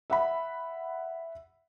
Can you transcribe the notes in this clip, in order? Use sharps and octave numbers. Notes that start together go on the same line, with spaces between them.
E5 F#5 B5